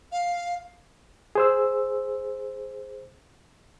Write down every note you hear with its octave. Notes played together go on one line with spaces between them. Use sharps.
F5
G#4 C5 E6